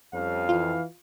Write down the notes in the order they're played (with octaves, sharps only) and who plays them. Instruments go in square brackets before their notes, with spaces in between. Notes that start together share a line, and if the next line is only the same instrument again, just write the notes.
[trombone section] F2 [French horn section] G3 C4 C#4 [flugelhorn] F5
[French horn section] E3 [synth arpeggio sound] F4